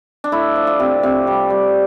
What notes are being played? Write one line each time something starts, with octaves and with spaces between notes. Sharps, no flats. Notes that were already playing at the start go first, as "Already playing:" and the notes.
D4
A3 E4
F3
F4
C3
C3
G3
G3